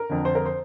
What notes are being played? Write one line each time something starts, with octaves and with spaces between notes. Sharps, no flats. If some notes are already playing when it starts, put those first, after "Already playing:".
Already playing: A#4
F2 D3
C5
A#4
C5